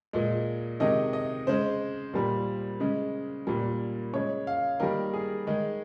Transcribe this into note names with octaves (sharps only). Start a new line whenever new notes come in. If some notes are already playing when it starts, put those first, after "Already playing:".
A#2 G#3
C3 D#3 G#3 D#5
D#5
C#3 G#3 C5
A#2 G3 A#3
C#3 G#3
A#2 G3 A#3
C#3 G#3 C#5
F5
D#3 G3 A#3 A#4
G#4
D#3 G#3